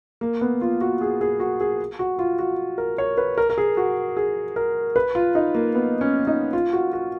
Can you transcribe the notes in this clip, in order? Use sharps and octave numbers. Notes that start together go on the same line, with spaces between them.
A#3
B3
F4
F#4
G#4
G#4
F#4
G#4
F#4
F4
F#4
A#4
C#5
B4
A#4
A#4
G#4
F#4
G#4
A#4
B4
F4
D#4
A#3
B3
C#4
D#4
F4
F#4
F#4